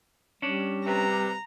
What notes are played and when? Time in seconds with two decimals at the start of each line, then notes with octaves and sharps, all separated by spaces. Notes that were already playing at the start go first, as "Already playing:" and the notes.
0.42 G3 C#4 D4
0.86 C3 B4 A#5